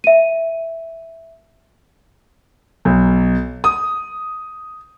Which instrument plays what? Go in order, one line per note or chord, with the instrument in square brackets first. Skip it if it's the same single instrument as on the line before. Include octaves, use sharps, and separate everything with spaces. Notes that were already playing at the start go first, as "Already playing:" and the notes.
[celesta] E5 D#7
[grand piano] B1
D#6